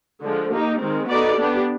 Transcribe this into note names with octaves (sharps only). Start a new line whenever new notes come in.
D3 F3 G#3
A#3 D#4 G4
D#3 G#3 C4
B3 D#4 F#4 A4 D5
B3 D4 G4